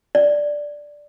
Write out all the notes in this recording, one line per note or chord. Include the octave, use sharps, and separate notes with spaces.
D5